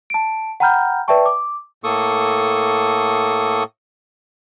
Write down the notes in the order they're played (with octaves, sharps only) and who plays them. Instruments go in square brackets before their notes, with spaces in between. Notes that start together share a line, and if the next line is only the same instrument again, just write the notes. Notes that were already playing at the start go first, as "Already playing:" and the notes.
[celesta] A5 D7
F#5 G5 A#5 B5 F6 G6
B4 D5 E5 G5 A5 C#6
D6
[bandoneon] A2 A#3 A4 C#6 D#6